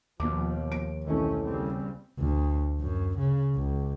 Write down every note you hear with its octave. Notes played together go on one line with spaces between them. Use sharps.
D#2 B2 F3 D6
D7
B1 D#3 E3 A3 C4 C#4
C#3 G3 C4
D2
F#2
C#3
C#2